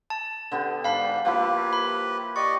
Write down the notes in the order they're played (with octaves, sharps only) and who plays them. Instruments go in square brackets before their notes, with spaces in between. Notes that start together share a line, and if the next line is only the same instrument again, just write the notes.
[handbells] A5
[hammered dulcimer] D3 B3 G4
[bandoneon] G#2 D4 [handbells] F5 B5
[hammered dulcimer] F3 A#3 E4 [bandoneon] G4 B4
[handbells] B5
[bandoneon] G4 D5 D#5 [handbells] C#6